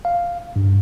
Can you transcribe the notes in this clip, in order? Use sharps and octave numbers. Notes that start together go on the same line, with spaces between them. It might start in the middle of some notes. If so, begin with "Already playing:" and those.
F5
G2